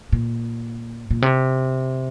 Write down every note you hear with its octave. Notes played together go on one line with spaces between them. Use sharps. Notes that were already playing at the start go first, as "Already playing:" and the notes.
A#2
A#2
C3